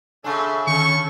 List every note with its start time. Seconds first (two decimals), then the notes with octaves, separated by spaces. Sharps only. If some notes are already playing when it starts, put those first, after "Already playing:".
0.24 C#3 D4 A4 E5 G#5 C6 C#6
0.67 D3 D#3 C#4 A4 C#6